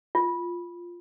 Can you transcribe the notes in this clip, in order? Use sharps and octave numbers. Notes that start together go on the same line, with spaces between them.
F4